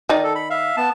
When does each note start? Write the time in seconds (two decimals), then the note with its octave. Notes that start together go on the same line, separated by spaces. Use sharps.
0.09 D#3 D#4 D5
0.24 A4
0.35 B5
0.50 E5 F5
0.77 B3 A5